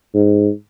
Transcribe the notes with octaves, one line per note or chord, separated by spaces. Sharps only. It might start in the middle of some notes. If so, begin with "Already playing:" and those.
G#2